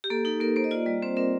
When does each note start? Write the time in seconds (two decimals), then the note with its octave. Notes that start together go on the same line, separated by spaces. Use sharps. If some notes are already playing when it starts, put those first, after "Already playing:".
0.04 G4
0.10 A#3 A4
0.25 D#4 A4
0.40 A#3 A#4
0.56 A#3 C5
0.64 D#5
0.71 F4 D5
0.86 G3 D5
1.02 C4 C5
1.17 C4 A#4